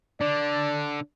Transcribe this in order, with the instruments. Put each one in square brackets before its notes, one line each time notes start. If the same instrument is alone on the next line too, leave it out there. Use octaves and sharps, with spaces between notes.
[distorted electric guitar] D3 [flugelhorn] D5